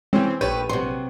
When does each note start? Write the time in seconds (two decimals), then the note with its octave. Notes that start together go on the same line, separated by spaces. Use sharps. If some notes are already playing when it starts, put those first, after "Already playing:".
0.13 E3 G#3 C4 C#4
0.41 A#1 A3 G4 B4 C#5 G6 D#7
0.69 C3 F#3 C6